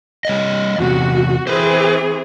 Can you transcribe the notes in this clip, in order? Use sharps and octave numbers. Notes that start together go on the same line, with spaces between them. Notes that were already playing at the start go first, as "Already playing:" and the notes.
G3 C#5 D#5
E2 C3 F#4
E3 C4 G#4 B4 C5